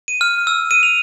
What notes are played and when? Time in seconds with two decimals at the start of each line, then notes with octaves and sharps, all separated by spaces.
0.08 D#7
0.21 F6
0.47 E6
0.71 D#7
0.83 F7